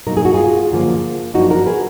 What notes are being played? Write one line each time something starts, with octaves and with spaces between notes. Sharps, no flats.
B2 F#3 A#3 D#4 A#4
G#4
F#4
F4 G#4
F#2 D3 F3 A#3
F#2 F3 A#3 D4 D#4 F#4
F#4 A#4
G#4 B4